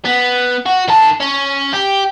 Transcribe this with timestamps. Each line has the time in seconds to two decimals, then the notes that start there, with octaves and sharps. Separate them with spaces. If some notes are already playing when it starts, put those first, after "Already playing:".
0.05 B3
0.66 F#4
0.88 D#3 A5
1.20 C#4
1.73 G4